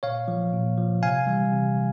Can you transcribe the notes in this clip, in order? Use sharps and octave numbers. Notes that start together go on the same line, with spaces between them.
A#2 C#5 F5
F3
A#2
F3
C3 F5 G#5
E3 G3
C3
E3